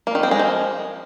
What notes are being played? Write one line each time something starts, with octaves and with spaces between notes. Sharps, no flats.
A#3
D#3
C4
G#3
F3